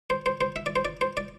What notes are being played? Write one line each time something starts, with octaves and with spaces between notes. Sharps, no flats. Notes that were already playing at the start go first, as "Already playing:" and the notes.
C5
C5
C5
E5
D5
C5
D5
C5
D5